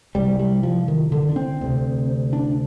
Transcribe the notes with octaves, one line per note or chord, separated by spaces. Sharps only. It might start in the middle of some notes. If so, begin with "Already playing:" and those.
C2 C3 G3
G3
F3
D#3
D3
D4
C4
D2 C3
D4